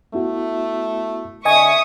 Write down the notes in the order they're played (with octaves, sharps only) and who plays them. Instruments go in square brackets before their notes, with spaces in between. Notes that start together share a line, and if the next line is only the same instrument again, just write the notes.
[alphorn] A3 [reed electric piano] B3 E4 F#4
[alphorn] D3 [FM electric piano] D#5 G#5 [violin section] E5 C#6 D#6